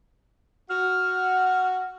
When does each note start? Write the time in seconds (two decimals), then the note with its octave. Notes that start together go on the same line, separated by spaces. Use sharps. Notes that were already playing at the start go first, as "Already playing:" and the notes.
0.69 F#4 F6